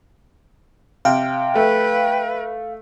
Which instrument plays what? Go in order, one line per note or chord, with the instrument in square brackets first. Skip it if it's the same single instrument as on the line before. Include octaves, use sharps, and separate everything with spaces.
[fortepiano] C3 [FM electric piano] F5 [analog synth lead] G5
[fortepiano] A3 [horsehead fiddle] B4